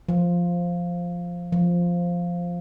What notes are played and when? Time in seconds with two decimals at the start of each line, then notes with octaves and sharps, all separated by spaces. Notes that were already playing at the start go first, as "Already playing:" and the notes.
0.09 F3
1.52 F3